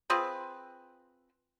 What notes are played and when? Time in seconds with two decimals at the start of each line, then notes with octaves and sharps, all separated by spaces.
0.10 C4 F4 G#4 B4